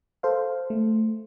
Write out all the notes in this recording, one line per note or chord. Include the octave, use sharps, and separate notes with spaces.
A4 C5 F5
A3